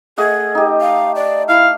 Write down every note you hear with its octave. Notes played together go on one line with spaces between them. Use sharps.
A3 G#4 D#5 F#5
D#4 G4
F5
D5
E4 F5